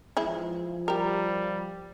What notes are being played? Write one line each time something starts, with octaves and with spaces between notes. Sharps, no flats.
E3 F3 G#3 E4
G3 G4 A#4